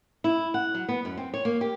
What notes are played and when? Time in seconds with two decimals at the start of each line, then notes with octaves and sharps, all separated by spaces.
0.24 E4
0.54 F#5
0.74 F#3
0.89 B3
1.05 F#2
1.17 C4
1.34 C#5
1.45 A#3
1.61 G4